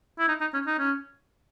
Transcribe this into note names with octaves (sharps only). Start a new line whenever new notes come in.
E4
D#4
D#4
C#4
D#4
C#4